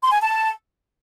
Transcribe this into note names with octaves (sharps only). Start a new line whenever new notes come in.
C6
G#5
A5